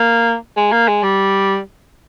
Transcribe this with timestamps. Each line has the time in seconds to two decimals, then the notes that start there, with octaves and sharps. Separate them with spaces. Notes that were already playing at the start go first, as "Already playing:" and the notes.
Already playing: A#3
0.57 G#3
0.72 A#3
0.88 G#3
1.03 G3